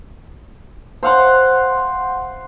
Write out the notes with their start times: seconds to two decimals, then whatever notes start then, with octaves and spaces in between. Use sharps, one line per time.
1.03 C5 F5 F#5 C6